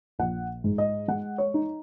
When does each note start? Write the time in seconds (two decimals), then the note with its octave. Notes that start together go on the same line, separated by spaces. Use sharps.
0.19 A#1 F#5
0.64 G#2
0.78 D#5
1.08 G#3 F#5
1.38 C#5
1.54 D#4